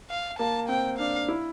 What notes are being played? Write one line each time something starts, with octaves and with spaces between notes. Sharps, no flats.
F5
A#3 A5
C4 G5
D4 F5
E4